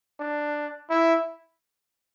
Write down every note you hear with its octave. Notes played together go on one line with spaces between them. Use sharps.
D4
E4